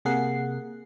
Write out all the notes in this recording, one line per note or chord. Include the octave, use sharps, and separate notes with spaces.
C3 A#3 G#4 A#4 F#5 C7